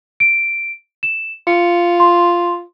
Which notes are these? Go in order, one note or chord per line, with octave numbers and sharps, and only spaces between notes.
D7
E7
F4 C#7
C6